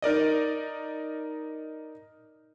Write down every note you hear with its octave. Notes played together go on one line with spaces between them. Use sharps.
D#4 A#4 D5 D#5